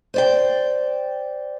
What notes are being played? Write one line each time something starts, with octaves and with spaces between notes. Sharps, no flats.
C5 D5 G5